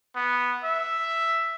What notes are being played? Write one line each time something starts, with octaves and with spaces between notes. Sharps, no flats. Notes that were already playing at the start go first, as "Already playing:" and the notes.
B3
E5